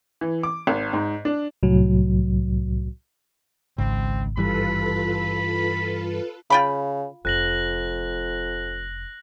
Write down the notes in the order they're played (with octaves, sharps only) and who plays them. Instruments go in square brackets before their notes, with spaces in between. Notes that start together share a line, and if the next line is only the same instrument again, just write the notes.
[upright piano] E3
D6
G#1
G#2
D4
[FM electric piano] C2 A2 F#3
[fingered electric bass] G#1 [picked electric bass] C#2 [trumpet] C4
[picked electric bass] G2 E3 G3 [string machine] F4 A4 B4 [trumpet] B5
[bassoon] C#3 [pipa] F4 G5 B5
[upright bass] F1 [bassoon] F2 [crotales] F#6 A#6 F#7